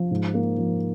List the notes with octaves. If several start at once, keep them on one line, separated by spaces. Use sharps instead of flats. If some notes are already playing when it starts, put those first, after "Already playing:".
Already playing: F3
G#2
A#3
F3